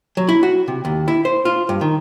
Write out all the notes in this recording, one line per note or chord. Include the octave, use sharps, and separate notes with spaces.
F#3
E4
F#4
C3
D#2
E4
C5
F4
G2
D#3